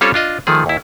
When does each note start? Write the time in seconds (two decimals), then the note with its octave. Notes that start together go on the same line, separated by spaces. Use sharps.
0.01 G3 C4 C#4 F4 A4 C#5
0.14 D4 F4 D#5
0.47 D#3 F3 A3 G#4
0.66 D#2 E4